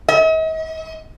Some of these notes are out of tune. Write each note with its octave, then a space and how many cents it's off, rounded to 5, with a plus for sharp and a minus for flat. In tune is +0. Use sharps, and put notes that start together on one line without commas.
D#5 +45